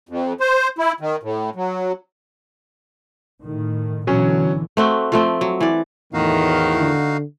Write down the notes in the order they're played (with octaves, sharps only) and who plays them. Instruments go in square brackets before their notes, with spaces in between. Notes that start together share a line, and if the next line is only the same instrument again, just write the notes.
[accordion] F2
C5
E4
D#3
A2
F#3
[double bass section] A2 D#3
[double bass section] B2 D3 E3 [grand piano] F#3 C#4
[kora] A3 C4 F#4
F3 A3 C4
F#3
E3 D5
[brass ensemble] E2 A2 [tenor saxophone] D#3 [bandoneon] D#4 F#4 F5
[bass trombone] D3